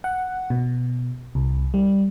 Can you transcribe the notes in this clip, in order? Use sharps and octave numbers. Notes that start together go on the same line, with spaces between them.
F#5
B2
C2
G3